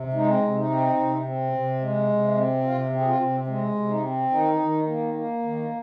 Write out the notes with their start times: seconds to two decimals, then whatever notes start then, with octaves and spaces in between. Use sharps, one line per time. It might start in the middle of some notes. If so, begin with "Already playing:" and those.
Already playing: C3
0.14 G#3 D#4
0.27 C4
0.40 C3 D#4
0.55 D#4
0.70 C4
0.97 C3
1.25 C4
1.52 C3
1.81 G#3
2.09 C3
2.36 C4
2.64 C3 F4
2.92 C4
3.00 G#4
3.06 F4
3.19 C3
3.47 G#3 C4
3.75 C3
3.89 D#4
4.03 C4
4.30 D#3 D#4
4.59 D#3
4.87 A#3
5.14 A#3
5.43 D#3